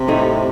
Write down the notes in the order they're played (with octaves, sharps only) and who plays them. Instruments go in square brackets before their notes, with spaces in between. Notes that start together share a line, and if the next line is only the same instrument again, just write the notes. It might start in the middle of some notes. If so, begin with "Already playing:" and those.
Already playing: [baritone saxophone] C3
[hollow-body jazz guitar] A2 A3 D#4